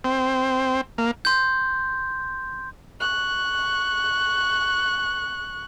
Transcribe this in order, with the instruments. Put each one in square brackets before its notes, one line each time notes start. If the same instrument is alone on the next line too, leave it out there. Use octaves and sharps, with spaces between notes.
[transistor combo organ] C4
A#3
[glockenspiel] C6 G6
[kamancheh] C#6 F#6